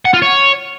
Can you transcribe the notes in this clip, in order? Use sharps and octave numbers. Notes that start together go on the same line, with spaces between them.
F#5
F4
C#5